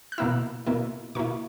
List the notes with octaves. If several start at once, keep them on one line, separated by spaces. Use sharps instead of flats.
F#6
B2 A#3 E4 E6
B2 A#3 E4
B2 A#3 E4 C#6